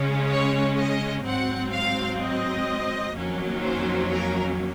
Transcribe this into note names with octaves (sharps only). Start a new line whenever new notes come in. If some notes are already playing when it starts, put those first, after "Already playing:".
Already playing: C#3 G#3 C#4
C#5
D#5
G#2 F#3 C4 F#5
F5
D#5
F2 D#3 F#3 A#3 C#4
C5
A#4